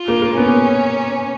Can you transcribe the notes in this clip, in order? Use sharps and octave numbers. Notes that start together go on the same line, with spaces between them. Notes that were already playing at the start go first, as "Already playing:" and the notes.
Already playing: F4
A#3
A#3
B3 C#4